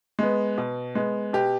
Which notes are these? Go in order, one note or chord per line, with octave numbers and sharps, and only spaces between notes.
G#3 B3
B2
G#3 B3
B2 G4